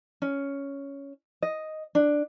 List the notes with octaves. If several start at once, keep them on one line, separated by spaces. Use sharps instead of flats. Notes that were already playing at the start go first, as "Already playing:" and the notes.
C#4
D#5
D4